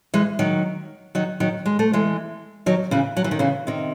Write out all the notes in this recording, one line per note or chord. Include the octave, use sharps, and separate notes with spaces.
E3 G#3
D#3 F#3
D#3 F#3
D#3 F#3
G#3
A3
E3 G#3
D#3 F#3
C#3 E3
F#3
E3
D#3
C#3 E3
C3 D#3